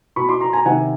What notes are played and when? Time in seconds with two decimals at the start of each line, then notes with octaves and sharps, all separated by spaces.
0.16 B2 B5 C#6
0.29 C6 D6
0.41 A#5 C6
0.53 G#5 A#5
0.65 C3 D#3 F#5 G#5